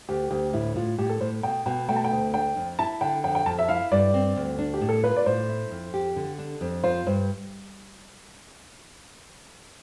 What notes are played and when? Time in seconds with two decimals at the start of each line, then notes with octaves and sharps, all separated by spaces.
0.09 D2 G4
0.31 D2 G4
0.53 A2 E4
0.76 A2 F4
0.98 A2 G4
1.09 A4
1.21 A2 C5
1.43 B2 G5
1.66 B2 G5
1.89 A3 G5
1.96 A5
2.05 G5
2.11 D2
2.33 D4 G5
2.56 F2
2.79 E4 A5
3.01 D3 G5
3.24 F2 G5
3.35 G5
3.46 F2 A5
3.59 E5
3.69 E4 F5
3.91 G2 D5
4.14 C4
4.36 D2
4.59 D4
4.74 G4
4.81 A2
4.89 A4
5.03 F4 B4
5.17 D5
5.26 A2 C5
5.49 E4
5.71 F2
5.94 G4
6.16 D3
6.39 D4
6.61 F2
6.84 F4 C5
7.06 G2 C5